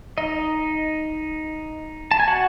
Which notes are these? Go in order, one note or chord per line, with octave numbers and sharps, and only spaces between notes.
D#4 D#5
A5
G#5
F#4 F#5